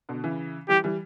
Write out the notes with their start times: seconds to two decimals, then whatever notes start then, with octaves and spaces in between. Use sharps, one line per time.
0.09 B2 D3
0.24 C#3 E3
0.69 E3 G3 G4
0.84 E3 G3